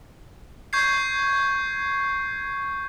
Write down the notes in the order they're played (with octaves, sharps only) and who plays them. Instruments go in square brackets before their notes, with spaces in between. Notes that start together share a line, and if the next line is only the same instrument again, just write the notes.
[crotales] C#6 G6 G#6 C7